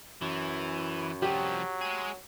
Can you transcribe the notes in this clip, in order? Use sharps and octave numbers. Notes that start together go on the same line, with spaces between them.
F#2 E3
C2 F3 F#3 G4
G#3 G#4